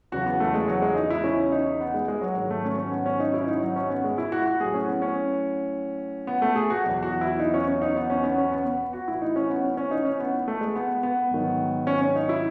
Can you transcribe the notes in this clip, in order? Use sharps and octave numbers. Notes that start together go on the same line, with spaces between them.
E2 C#3 F#3 F#4
B3
A3
G#3
F#3
G#3
D#4
E4
C#4
D#4
B3
G#3
G#3
F#3
G#2 D#3 F#3
A3
C#4
C#4
B3
C#4
D#4
E4
C#4
D#4
F#3
C#4
B3
G#3
E4
F#4
F#4
A2 F#3 G#4
C#4
B3
C#4
B3
A3
G#4
F#4
E2 B2 F#3
F#4
E4
D#4
C#4
C#4
D#4
B3
C#4
B3
C#4
B3
B3
F#4
A2 E3 E4
D#4
C#4
B3
C#4
C#4
D#4
C#4
B3
A3
G#3
B3
B3
G#2 D#3 F#3
C#4
C#4
D#4
E4